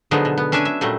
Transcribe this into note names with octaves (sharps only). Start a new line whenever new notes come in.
D3 F3 F#3 G#3 B3 D#4
B2
B3
C#4 D4 E5 G#5
E5
A#2 F#3 G3 A3